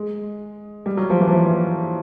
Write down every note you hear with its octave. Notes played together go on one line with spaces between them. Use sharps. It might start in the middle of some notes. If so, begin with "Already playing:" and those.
Already playing: G#3
G3
F#3
F3
E3
F3
E3